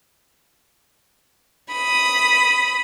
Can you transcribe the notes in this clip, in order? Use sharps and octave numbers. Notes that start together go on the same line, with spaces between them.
B5 D#6